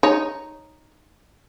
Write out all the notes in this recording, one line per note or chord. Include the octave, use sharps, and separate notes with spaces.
D#4 C#5